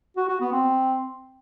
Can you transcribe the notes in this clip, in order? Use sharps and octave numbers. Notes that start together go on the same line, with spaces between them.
F#4
F#4
B3
C4